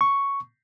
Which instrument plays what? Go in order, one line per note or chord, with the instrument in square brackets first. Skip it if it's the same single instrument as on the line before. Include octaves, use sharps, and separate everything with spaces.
[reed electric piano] C#6